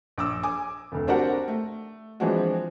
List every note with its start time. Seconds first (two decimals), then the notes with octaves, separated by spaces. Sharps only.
0.18 A#1 D6 E6
0.43 G#5 D6 D#6
0.92 F1 D2
1.07 C4 D4 F#4 G4 A#4 F#5
1.48 A3
2.20 E3 F3 G#3 C4 D4 F#4